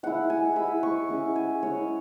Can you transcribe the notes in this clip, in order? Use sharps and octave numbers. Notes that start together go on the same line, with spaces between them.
G#3 E4 F#5
G#5
G#3 E4 B5
C#6
G#3 C#4 E4
G#5
G#3 C#4 E4 C#5